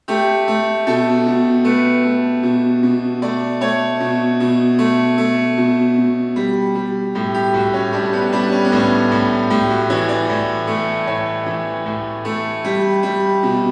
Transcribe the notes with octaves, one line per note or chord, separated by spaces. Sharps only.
A3 G4
A3
B2 A4
B2
A3 B4
A3
B2
B2
A3 D5
A3 C#5
B2
B2
A3
A3
B2
B2
G3
G3
A2 G4
G4
A2 F#4
C#4
G3 D4
B3
G3 D4
C#4
B3
A2 C#4
A2
A2 G4
F#4
E3 C#5
D5
A2
A3
A2 C#5
E3
A2
A3
G3
G3
B2